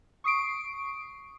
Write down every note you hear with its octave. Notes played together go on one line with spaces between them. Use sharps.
C#6 D#6 C7 D7